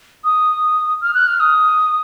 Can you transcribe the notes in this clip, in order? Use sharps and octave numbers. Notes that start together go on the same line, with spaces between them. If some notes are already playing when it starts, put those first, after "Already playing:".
D#6
F6
F#6
F6
D#6